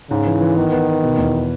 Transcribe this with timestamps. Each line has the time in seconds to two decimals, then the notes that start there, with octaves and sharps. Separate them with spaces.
0.10 G#2 C#3
0.26 E3
0.41 E3
0.56 D#3 B3
0.72 B3
0.88 B3
1.03 B2
1.18 E2